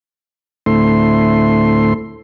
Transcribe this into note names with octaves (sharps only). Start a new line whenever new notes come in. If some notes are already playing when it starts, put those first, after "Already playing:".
D2 A2 A3 C4 E4 C6